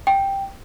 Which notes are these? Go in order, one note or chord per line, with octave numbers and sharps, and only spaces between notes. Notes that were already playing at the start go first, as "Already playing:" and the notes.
G5